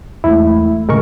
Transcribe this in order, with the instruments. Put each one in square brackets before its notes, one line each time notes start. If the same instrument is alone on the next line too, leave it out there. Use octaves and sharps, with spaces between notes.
[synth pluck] E2 G#2 A3 [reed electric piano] E4
[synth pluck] A2 C#3 [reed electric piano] G#3 A#4 C#6